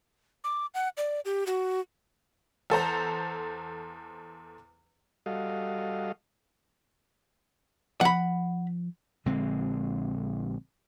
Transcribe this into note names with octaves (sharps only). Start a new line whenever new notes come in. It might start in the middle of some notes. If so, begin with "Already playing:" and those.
D6
F#5
D5
G4
F#4
E2 A4 C5 A#5
G3 F#4 A4 D#5 F5
F3 F#5 B5
A#1 D3 G#3 C4